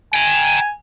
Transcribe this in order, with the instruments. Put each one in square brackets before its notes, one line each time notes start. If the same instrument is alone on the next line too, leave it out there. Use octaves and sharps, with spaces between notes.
[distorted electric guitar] G5 A#5 [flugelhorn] G#5